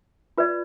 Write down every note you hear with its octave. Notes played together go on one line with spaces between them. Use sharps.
F4 B4 D5